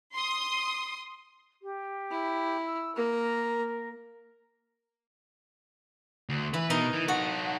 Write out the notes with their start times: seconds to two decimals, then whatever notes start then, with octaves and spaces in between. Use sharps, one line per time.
0.15 C6 D#6
1.63 G4
2.11 E4
2.66 E6
2.96 A#3 A#4 A#5
6.29 D2
6.54 E3 B4
6.70 B2 D#4 A#4
6.93 E3
7.08 D#4 F#4 A4